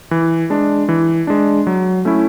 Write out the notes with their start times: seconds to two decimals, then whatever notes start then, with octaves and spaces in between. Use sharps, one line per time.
0.11 E3
0.50 G#3 D4
0.89 E3
1.27 G#3 D4
1.67 F#3
2.05 A3 C#4 E4